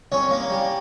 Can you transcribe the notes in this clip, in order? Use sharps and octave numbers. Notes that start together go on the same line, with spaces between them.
C2 C#4 C#5
A#3
G3